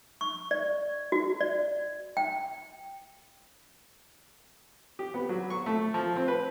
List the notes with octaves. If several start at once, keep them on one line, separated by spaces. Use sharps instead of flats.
C#6
D5
F#4
D5
G5
G4
B3
F#3
C#6
A3
F3
C4
B4